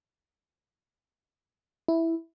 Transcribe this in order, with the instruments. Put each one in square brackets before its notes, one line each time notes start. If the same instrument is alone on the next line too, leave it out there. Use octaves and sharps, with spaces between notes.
[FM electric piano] E4